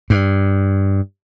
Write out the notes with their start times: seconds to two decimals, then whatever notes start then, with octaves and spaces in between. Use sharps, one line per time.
0.10 G2